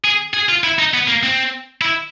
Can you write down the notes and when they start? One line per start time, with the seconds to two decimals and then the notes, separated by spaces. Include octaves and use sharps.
0.04 G#4
0.34 G#4
0.49 F4
0.64 E4
0.79 D#4
0.94 B3
1.08 A#3
1.23 C4
1.81 E4